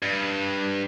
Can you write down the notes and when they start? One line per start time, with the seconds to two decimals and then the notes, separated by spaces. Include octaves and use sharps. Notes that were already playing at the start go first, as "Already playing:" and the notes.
0.02 G2